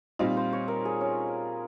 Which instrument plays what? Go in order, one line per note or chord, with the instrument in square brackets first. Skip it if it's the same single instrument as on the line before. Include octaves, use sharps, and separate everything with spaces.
[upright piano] A#2 G3 C4 D#4 [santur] F4
[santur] C5
C#5
A#4
G#4
C#4